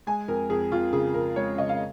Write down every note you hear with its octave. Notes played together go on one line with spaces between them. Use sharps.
G#3 G#5
F2 A#4
F2 G#4
F2 F4
C#3 G#4
F2 A#4
G#3 C#5
C#3 D#5
F5